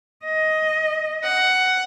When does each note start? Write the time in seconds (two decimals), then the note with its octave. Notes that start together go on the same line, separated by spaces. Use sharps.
0.25 D#5
1.24 F#5